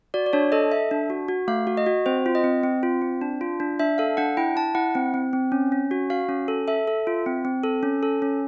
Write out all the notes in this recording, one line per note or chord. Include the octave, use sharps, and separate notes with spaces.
F#4 D5
D5
D4 C#5
A4 D#5
A4 E5
D4
F#4
F#4
A3 F5
F#4
D#5
F#4
C4 C5
F4
D#5
C4
C4
F4
C4
D4
F4
D4
D4 E5
A4 F5
D4 F#5
E4 G5
E4 A5
E4 F#5
C4
C4
C4
C#4
C#4
F#4
F#4 F5
C#4
A4
A4 E5
A4
F4
C4
C4
A4
C#4
A4
C#4